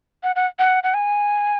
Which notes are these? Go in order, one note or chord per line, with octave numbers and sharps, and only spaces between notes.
F#5
F#5
F#5
F#5
G#5